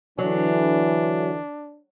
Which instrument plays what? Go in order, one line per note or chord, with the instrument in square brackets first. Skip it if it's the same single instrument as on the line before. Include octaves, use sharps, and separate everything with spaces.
[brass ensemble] D3 E3 [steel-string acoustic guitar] F#3 [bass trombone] D4